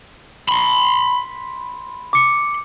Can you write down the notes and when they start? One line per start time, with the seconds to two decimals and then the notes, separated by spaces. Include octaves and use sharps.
0.49 B5 C6
2.13 D6 C#7